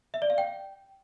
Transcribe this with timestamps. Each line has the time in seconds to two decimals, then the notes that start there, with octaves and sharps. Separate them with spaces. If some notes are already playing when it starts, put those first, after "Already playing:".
0.14 E5
0.22 D5
0.30 F5
0.38 G5